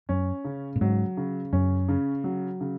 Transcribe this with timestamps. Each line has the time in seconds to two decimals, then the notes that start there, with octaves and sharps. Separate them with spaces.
0.09 F#2 C#4
0.45 C#3
0.76 A#2
0.81 G#2 F#3
1.17 C#3
1.53 F#2 C#4
1.89 C#3
2.24 F#3
2.61 C#3